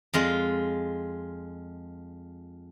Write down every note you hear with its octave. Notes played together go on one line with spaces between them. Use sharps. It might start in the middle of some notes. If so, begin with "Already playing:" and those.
F2 G#3 F4